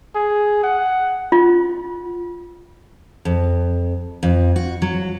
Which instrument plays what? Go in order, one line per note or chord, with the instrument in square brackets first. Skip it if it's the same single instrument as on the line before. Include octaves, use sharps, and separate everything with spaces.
[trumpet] G#4
F#5
[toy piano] F4
[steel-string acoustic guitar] F2
F2
F#4
F#3